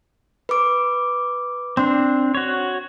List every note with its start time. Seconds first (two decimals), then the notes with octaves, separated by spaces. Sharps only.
0.49 B4 D6
1.77 C4 D4 C6
2.35 F#4 C#5